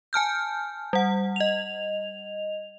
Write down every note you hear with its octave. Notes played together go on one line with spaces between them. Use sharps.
G#5 A5 F6 G6
G3 F#5
D#5 F7